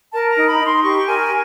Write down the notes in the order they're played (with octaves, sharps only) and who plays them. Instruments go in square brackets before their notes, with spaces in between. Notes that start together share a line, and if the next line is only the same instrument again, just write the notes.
[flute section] A#4 A5
A#5
D#4
B5
D#4
C6
G4 C#6
A#4 G#5